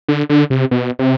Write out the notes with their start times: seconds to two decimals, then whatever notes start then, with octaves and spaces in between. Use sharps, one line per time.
0.08 D3
0.29 D3
0.50 C3
0.71 B2
0.99 C3